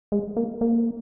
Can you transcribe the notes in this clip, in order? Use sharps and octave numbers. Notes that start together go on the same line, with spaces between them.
G#3
A#3
A#3